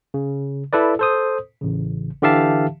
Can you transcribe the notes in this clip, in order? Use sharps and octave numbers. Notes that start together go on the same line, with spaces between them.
C#3
E4 A4 B4 D5
A4 C5 D#6
A1 C#3
D3 E3 G4 E5 F5 A5